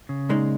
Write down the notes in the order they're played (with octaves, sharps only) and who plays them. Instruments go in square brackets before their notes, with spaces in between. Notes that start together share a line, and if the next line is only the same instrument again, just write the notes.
[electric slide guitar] C#3
[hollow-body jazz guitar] A#2 G#3 D#4